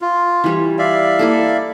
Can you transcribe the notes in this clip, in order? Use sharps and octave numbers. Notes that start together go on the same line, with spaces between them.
F4
E3 G3 C#5
D5 E5 F5
A#3 E4 A4